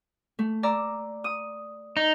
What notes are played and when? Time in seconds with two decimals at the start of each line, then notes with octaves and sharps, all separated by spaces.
0.39 A3
0.63 D5 A#5 E6
1.24 D#6
1.97 D#4